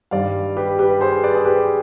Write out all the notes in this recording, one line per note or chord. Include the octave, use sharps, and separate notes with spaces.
G2 D#3 G3 D5 F5
G4 B4
G4 B4
G#4 C5
B4 D5
G#4
G4 B4